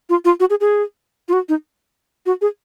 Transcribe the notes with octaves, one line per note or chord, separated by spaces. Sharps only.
F4
F4
F#4
G#4
G#4
F4
F#4
D#4
F#4
G#4